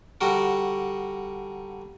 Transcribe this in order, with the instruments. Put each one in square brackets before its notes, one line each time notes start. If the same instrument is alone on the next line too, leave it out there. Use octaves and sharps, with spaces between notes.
[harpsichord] D3 G3 D4 F#4 A#4